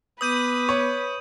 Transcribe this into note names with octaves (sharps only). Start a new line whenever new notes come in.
B3 B4 D6 D#6 G6 D#7
C#5